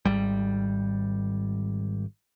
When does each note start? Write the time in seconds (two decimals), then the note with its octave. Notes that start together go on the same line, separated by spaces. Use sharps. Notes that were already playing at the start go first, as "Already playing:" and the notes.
0.05 G#1 G3